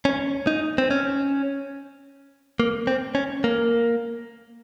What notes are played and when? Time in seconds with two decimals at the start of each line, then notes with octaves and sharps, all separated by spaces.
0.05 C#4
0.47 D#4
0.78 C4
0.91 C#4
2.60 A#3
2.87 C4
3.15 C#4
3.44 A#3